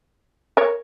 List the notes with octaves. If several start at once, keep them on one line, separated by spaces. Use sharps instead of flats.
A#4 C#5